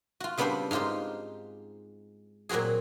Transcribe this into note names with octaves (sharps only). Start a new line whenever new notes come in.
F4 F#4
C#3 G3 B3 C4 D4 C5
G#2 D#4 F4 G4 C5
A#2 F#3 C4 F#4 G#4